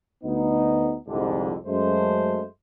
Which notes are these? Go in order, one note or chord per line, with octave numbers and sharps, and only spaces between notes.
D2 B3 D#4
C2 F2 G#2 D3
F#2 G#3 A3 C5